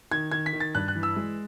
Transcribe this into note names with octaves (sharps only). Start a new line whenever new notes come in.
D#3 G#6
D#3 G#6
B6
D#3
A6
G2 F#6
F#6
E3
E6
G#3